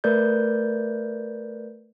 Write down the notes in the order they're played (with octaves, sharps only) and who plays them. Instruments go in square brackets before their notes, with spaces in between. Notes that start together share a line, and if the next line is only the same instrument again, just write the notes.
[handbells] A3 A#4 B4 D5 G6